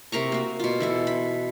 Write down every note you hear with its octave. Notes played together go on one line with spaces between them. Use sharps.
C3 A#4 A#5 C#6
A#3 F#4
B2 F4
E3 E4 A4
B5